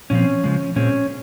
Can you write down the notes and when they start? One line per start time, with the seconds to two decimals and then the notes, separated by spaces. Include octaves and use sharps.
0.10 A#2 F3 C4 C#4
0.44 C#3 F3 G#3
0.76 A#2 G#3 C4 C#4